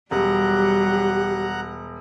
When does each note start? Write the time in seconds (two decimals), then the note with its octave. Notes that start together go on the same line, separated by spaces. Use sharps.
0.11 E1 F#3 G3 G4 F#5 A#5 F#6